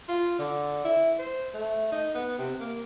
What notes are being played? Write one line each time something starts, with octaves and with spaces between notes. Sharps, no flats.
F4
D3
E4
C5
A3
D#4
B3
C3
A#3